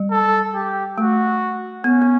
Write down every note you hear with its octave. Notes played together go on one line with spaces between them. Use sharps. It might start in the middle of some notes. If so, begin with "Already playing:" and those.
Already playing: G3
A4
G4
A3 F#4
B3 C#4
B3